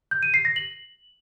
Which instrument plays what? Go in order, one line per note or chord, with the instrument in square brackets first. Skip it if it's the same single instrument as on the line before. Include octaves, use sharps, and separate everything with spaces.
[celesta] G6
D#7
C7
A#6
F#7